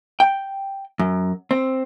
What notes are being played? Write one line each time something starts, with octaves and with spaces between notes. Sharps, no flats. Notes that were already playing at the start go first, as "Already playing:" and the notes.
G5
F#2
C4